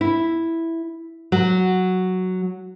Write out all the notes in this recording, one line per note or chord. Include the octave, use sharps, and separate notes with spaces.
E4
F#3